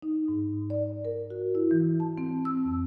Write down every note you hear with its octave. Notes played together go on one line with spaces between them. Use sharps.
D#4
G#2
D5
A#4
F#4
E4
E3
A5
C4
E6
F2